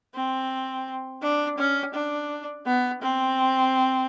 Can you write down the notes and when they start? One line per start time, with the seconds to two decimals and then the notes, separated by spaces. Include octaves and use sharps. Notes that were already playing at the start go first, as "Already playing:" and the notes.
0.15 C4
1.22 D4
1.58 C#4
1.94 D4
2.66 B3
3.02 C4